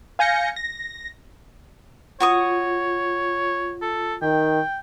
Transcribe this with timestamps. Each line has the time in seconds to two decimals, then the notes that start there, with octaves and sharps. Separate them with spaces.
0.19 F5 G#5 G6 A#6 C#7
0.56 A#6
2.20 F4 F#4 C#5 C#6 D#6
3.82 A4
4.22 D#3 G5